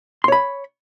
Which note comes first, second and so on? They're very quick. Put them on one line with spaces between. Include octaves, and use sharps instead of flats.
C6 C#5 B5